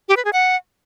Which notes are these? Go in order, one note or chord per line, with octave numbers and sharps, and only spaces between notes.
G4
B4
G#4
F#5